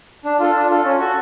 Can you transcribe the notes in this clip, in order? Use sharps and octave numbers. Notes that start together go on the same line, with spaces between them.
D4
F4 A4
D4
F4 A4
C#4
F#4 A4